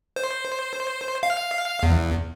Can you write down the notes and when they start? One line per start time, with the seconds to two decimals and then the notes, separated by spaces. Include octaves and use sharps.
0.16 C5
1.23 F5
1.83 E2